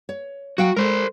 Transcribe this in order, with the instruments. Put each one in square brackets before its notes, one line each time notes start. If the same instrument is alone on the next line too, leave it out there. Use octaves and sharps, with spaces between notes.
[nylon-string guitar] C#5
[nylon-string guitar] F#3 F5 G5 [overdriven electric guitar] F#4
[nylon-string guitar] G#3 A4 [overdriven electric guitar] A#4 C5